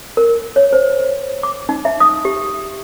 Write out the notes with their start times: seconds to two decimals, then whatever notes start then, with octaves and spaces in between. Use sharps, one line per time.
0.17 A#4
0.56 C#5
0.73 C5
1.43 D6
1.69 D#4
1.85 E5
2.00 D#6
2.25 G4